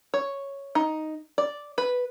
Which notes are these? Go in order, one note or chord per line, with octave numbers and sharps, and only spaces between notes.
C#5
D#4
D5
B4